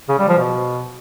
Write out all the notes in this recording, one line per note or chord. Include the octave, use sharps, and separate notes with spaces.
C#3
G3
F3
B2